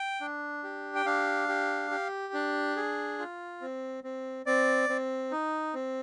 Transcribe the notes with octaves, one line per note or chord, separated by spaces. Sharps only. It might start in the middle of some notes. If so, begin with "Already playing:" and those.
Already playing: G5
D4
G4
G5
D4 F5
G4
G4
D4
G#4
F4
C4
C4
C4 D5
C4
D#4
C4